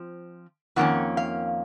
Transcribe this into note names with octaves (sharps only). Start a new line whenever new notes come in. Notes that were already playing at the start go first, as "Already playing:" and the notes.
Already playing: F3 C4
F2 D#3 A#3 C#4 F#5
F5